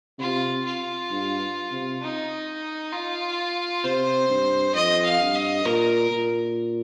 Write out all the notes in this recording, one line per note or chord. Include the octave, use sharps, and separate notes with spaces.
C3 F4
F4
G2
C3
D#4
F4
C3 C5
G2
F2 D#5
F5
G2
D#5
A#2 A#4
A#2